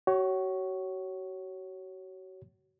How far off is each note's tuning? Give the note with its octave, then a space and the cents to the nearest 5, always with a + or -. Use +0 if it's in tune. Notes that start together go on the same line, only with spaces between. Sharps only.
F#4 +35 C#5 +0